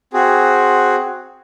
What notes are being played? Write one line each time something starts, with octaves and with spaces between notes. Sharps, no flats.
C4 F#4 G#4